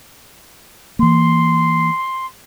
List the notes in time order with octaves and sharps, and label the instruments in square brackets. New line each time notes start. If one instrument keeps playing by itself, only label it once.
[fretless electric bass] E3 A#3 [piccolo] C6